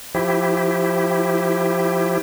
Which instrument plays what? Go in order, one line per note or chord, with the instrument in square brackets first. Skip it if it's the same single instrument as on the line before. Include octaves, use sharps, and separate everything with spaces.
[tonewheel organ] F3 E4 G4